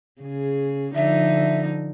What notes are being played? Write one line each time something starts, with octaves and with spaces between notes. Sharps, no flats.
C#3 G#4
D3 F3 D#4 E5